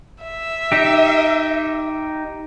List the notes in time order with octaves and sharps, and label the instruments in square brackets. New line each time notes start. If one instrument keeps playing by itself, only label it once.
[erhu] E5
[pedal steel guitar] D#4 G4